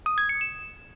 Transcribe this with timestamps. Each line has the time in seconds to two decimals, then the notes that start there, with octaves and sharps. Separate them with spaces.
0.06 D#6
0.18 G#6
0.29 C#7
0.41 E7